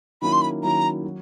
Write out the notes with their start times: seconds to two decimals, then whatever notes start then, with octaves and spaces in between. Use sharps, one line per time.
0.22 D#3 F#3 A#3 C#4 E4 B5
0.32 C6
0.41 B5
0.63 D#3 F#3 A#3 C#4 E4 A#5
1.04 F#3